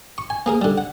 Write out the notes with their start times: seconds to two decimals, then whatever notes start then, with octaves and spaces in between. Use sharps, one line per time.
0.18 C#6
0.30 G#5
0.46 A#3 G#4 A#4
0.61 D3 G3
0.78 F#5